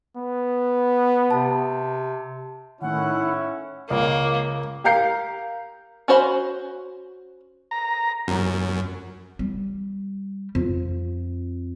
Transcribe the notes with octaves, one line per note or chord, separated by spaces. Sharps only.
B3
C3 A5
A2 D#3 C#4 E4 F#5
C#2 A#3
G4 A#4 F5 A#5 G6 C7
C#4 F#4 C5 A#5 B5
A#5
F#2
G3
F2